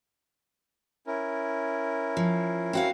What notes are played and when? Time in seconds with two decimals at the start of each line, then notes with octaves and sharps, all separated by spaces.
1.07 C#4 E4 A#4
2.17 F3
2.73 C4 F#4 F5